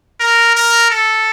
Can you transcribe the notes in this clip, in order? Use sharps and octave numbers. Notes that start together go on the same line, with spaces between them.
A#4
A#4
A4